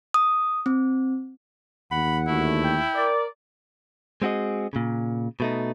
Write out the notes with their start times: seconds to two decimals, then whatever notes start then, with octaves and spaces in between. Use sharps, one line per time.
0.14 D#6
0.66 C4
1.92 D#2 F#5 B5
2.27 D2 A3 E4
2.64 G5
2.94 A#4 D5
4.22 G#3 C4 F#4 G#4 D#5
4.73 A#2 C#3
5.40 B2 A3 D#4